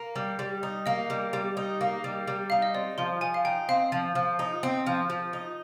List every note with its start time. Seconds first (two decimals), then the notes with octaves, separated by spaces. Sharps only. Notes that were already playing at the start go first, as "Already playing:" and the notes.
Already playing: A#3
0.16 G3
0.39 G3
0.63 D#4
0.86 A#3 D#5
1.10 G3
1.33 G3
1.57 D#4
1.81 A#3
2.04 G3
2.28 G3
2.50 D#4 F5
2.62 D#5
2.74 C4 D5
2.98 F3 C6
3.21 F3 G#5
3.34 F5
3.45 D#4 G5
3.69 C4 F5
3.92 F3
4.15 F3
4.39 D#4
4.63 C4
4.86 F3
5.10 F3
5.33 D#4